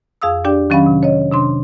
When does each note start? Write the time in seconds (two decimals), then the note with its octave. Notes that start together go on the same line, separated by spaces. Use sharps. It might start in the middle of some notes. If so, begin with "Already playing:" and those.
0.22 F2 G#4 F5 D#6 E6
0.45 D4 G4 D5 G5
0.70 D#3 F#3 C#4 F5 G5 B5
0.86 C3
1.03 C#5 D#5
1.31 C3 D4 C6